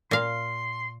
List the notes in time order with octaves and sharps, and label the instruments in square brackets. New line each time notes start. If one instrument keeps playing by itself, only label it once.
[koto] A#2 F5 [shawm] C6